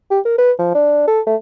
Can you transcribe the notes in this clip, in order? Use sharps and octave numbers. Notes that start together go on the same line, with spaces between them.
G4
A#4
B4
F3
D4
A4
A3